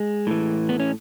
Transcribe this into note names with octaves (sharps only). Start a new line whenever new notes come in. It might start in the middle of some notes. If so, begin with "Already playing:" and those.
Already playing: G#3
A2 E3
B3
C#4